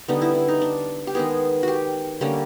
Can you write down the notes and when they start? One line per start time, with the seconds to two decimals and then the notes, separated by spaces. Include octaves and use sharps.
0.08 D3 G3 B3 D#4
0.22 E4
0.35 E4
0.48 D#4
0.61 D4
1.07 G4
1.15 D#3 G#3 B3 G#4
1.63 F#4 G4
2.21 D3 G3 A#3 C#4